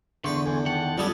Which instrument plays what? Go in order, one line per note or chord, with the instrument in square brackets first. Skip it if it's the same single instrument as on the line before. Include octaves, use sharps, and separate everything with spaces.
[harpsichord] E2 B4 G5 [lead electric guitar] D3 [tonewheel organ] C6 C#6
[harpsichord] E2 [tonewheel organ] A4 G#5
[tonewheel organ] D#3 G5 A5 [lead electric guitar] F#5
[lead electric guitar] F#2 G3 [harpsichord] B3 G#4 A4 [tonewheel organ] F4 D5